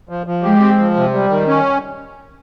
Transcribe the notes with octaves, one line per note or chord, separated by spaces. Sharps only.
F3
F3
G#3 G4
C4
F3
C3
G3
D#3
C#4